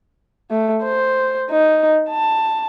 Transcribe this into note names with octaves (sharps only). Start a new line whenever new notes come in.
A3
C5
D#4
A5